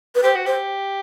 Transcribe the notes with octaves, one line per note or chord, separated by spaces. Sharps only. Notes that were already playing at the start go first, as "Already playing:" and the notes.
B4
G4 C5
F#4
G4 C5